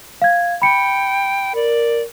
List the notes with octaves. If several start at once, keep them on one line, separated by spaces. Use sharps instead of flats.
F5 G#6
G5 B5 C#7
A#4 D5